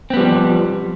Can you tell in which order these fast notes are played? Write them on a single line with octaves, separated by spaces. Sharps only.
C4 B3 G3 F3